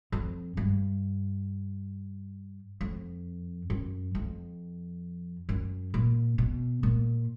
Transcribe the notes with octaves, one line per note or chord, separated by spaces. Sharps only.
F2
G2
F2
F#2
F2
F#2
A#2
B2
A#2